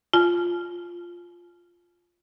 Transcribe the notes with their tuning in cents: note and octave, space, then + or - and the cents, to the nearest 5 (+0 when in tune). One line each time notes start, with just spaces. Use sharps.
F4 +0 G#5 +45